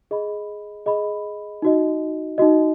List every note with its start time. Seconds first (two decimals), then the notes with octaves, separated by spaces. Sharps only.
0.11 G#4 D#5 B5
0.86 G#4 D#5 B5
1.62 D#4 F#4 D#5
2.38 D#4 F#4 D#5